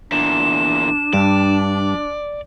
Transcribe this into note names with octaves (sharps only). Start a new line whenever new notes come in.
E2 A#2 D4 E7
G2 D5